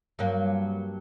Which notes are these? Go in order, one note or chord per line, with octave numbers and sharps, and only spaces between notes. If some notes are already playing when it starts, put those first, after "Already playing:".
G2 F#3 A#3